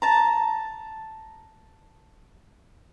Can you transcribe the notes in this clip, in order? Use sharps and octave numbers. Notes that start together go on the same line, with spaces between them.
A5 A#5